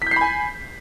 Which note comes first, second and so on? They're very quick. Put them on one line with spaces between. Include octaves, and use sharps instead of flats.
B6 G6 C7 B5 G#5